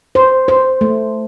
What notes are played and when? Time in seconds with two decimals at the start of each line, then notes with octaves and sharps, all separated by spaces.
0.15 C5
0.48 C5
0.81 A3